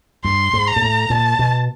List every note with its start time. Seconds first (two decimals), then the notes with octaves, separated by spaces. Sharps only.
0.24 G2 C6
0.53 G#2
0.68 A#5
0.76 G#2
0.82 A2
1.10 A#2 A5
1.39 B2